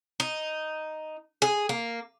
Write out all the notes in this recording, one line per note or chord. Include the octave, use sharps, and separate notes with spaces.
D#4
G#4
A#3